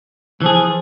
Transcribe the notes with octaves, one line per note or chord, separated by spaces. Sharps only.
E3 F3 G#4